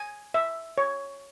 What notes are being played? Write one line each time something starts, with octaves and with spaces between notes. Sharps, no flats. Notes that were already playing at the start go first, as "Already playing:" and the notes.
Already playing: G#5
E5
C#5